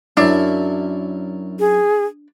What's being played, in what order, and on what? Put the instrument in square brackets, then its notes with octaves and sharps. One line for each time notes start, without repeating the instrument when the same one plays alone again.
[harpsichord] F#2 E4 [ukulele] D4
[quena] G#4